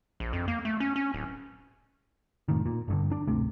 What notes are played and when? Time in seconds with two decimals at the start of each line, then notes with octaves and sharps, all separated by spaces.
0.20 A#1
0.33 F2
0.48 A#3
0.65 A3
0.80 C#4
0.96 C#4
1.14 D1
2.48 F1 A2 D#3
2.66 A#2
2.88 G1 G2 D3
3.12 D4
3.27 D1 G#1 C3 A3